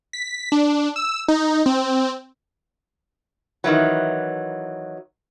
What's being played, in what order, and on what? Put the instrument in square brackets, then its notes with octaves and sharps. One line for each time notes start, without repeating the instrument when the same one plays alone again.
[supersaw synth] B6
D4
E6
D#4
C4
[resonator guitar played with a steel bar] D#3 E3 F#3